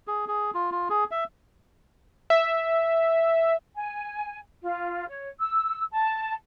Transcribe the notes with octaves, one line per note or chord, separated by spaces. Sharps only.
G#4
G#4
F4
F4
G#4
E5
E5
G#5
F4
C#5
E6
A5